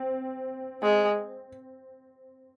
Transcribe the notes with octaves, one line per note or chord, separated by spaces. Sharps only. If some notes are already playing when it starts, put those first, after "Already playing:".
Already playing: C4
G#3